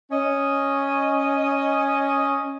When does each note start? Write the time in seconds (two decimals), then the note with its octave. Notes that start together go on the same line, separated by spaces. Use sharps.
0.11 C#4 D#5